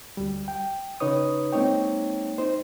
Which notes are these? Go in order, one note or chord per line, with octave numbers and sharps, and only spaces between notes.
D2 G3
G5
C#3 D#4 B4 C#5 D#6
G#3 A#3 C4 D#4 C#5 G5
D#4 C5